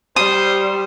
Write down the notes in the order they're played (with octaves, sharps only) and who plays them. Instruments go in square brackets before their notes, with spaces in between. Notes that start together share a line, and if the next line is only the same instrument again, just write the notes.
[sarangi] G3 [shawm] C5 [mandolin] D#6